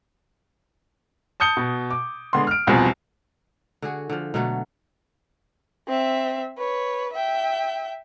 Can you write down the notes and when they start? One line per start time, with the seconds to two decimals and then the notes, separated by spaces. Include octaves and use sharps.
1.40 A5 D#6 G6 C#7 G7
1.57 B2
1.91 D6
2.33 D3 G#3 B3 C6
2.47 F6 D7
2.67 E1 C2 B2 F3 C4 G#5
3.82 D3 F#4 G#4
4.10 D3 F3
4.34 B2 D3 F#3 A3
5.88 C4 E5
6.58 B4 C#5
7.13 E5 G5